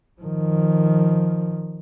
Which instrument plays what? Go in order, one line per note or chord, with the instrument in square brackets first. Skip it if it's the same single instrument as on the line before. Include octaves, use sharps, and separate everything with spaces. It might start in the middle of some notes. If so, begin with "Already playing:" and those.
[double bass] D#3 F3